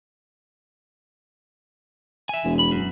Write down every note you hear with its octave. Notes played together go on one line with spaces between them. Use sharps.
E5 G#5
E1
B5
F#2